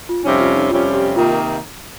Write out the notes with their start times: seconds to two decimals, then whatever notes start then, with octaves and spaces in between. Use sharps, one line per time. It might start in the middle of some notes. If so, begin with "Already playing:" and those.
0.09 F4
0.23 F2 C3 G3 C#4 D#4
0.39 F4
0.55 D#4
0.70 F2 C3 G3 C#4 F4
0.93 G4
1.16 C3 D#3 A#3 D#4 F4